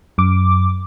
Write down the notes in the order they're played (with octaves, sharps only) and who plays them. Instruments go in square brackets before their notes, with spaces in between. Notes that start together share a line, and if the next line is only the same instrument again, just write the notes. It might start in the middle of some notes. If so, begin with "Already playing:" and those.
[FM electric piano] F#2 D6